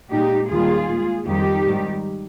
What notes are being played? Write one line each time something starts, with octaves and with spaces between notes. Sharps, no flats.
A#2 G#3 D#4 G4
D#2 D#3 G3 F4 G#4
A#2 G#3
F2 D#3 G3 D#4 G4
G#2 D#3 G3